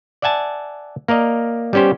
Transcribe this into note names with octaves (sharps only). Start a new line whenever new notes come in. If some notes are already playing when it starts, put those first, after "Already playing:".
D5 E5 F#5 G#5 A5
A#3 A#4 D5 D#5
G3 B3 C#4 G4 C5